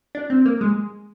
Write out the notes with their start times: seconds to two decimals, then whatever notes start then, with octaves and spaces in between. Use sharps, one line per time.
0.15 D4
0.30 C4
0.46 A#3
0.61 G#3